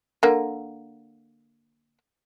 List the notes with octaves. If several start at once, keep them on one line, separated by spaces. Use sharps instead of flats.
D3 A#3